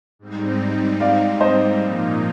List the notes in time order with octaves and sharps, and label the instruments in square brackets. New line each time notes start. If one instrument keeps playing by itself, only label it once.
[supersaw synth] G#2 G3 C4 D#4
[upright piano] D5 F5
C5 D#5
[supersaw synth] A#2 F3 A#3 D#4